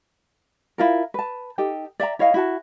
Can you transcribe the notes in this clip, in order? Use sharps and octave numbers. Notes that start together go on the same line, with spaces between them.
E4 F4 A#4
B4 A5
D#4 G4 A4 G5
D5 E5 G5 A#5
E4 C#5 D#5 F5
E4 F#4 A5